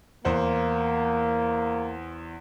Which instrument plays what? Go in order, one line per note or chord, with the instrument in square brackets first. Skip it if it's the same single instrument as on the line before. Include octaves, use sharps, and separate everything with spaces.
[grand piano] E2 C5 F#5 [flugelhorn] A#3